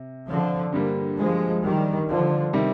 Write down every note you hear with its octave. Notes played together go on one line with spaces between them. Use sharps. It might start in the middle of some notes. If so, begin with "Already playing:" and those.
Already playing: C3
D3 F3
G2 D3 G3 A#3
F3 G#3
D#3 G3
D3 F3
C3 D#3 G3